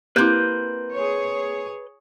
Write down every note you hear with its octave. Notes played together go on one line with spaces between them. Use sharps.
A#3 C4 E4 G4 B4 F#6 G6
G#4 C#5